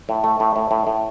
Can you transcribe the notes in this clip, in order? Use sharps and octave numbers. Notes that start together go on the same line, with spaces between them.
A2
A3
A2
A2
A2
A2